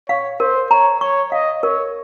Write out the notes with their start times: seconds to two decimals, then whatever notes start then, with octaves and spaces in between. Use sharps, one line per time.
0.09 C#5 F5
0.40 A#4 C5
0.71 C#5 A#5
1.01 C#5 C#6
1.32 D#5 F5
1.63 A#4 C#5